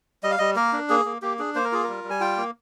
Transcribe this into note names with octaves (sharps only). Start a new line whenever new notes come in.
G3 D#5
F5
G3 D#5
A#3 A#4
D4
A#3 G#4
A#3
A#3 G4
D4 G#4
A#3 C5
A#4
F4 G#4
G3 A#4
G3
G#5
F4 G5
A#3